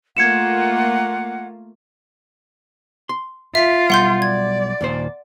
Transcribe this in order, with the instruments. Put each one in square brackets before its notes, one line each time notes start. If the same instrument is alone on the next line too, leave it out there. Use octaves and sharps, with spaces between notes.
[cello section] A3 A#3 F4 [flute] F#5 [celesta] G#6 C#7 E7
[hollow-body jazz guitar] C6
[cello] F4 [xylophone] E5 B6
[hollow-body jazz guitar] B1 G3 [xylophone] F#5 C6 G6
[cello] D5 [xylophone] G#6
[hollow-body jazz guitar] D#2 A#2 C5